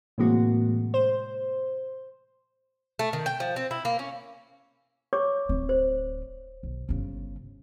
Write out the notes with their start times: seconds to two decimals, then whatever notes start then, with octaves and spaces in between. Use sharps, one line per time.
0.18 A2 C3 E3 G#3 A#3 F#4
0.94 C5
2.99 A3
3.13 D#3
3.26 G5
3.40 F3
3.56 C4
3.71 E4
3.85 A#3
3.99 C#4
5.13 C#5 C#6 D6
5.49 D1 C4
5.69 C5
6.63 B1
6.89 G1 C#3